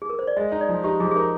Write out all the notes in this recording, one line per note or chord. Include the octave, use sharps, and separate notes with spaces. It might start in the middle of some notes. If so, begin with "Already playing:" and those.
G#4
A#4
C5
D5
G#3 D#5
D#4
D5
F3
D#4 G4
F3 G#4
G#4
D#4 A#4